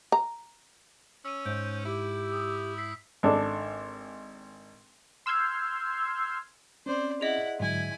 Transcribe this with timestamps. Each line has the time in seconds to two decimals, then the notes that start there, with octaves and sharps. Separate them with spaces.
0.12 A#5
1.25 C#4 E6 D#7
1.46 G#2 C5 G6 D7
1.85 E4 G4
2.32 D#6
2.77 E6 B6 C7
3.23 G#1 D4 A4
5.26 C6 E6 F6 G6 G#6 C7
6.86 C4 C#4 C5 D5
7.21 E4 G#4 D#5 F#5
7.60 G#2 D3 F#3 E4 G#5